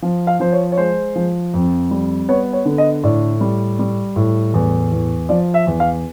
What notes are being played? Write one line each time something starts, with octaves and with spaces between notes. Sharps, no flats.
F3
F5
F3 C5
C#5
C#5
G#3 C5
F3
F2
G3
B3 C#5
C#5
D3
D#5
A2 D5
G3
G3
A2
E2
E2
F3 D5
E5
E2
F5